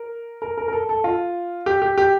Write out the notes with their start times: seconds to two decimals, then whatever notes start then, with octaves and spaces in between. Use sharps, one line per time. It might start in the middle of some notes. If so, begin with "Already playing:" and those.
Already playing: A#4
0.42 A#4
0.58 A#4
0.68 A#4
0.73 A4
0.89 A4
1.04 F4
1.66 G4
1.82 G4
1.98 G4